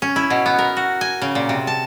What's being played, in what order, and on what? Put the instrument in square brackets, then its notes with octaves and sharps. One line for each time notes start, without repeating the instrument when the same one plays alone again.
[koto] C#4
E4
B2
B3
A#4
F#4
G#5
C#3
A#2
C3
A5